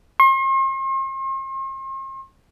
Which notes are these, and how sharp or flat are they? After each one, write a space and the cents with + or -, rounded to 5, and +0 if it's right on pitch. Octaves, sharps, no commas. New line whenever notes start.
C6 +45